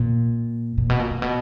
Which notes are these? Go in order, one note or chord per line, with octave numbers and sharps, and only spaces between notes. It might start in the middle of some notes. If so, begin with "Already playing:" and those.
Already playing: A#2
A#2
B2
A#2
A#2
B2